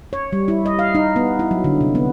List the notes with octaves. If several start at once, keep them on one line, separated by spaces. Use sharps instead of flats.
C#5
G3
E4
D#5
F5
D#4
B3
E4
F#3
D3
C3
B3